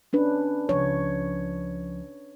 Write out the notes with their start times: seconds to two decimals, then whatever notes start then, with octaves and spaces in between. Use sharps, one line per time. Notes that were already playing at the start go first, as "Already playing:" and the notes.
0.13 C#4 D4 B4
0.69 C#2 F3 C#5